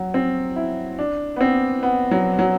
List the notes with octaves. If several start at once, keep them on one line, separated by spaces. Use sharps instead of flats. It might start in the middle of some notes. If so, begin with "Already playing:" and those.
Already playing: F#3
C4
E4
D4
B3
C4
B3
F#3
F#3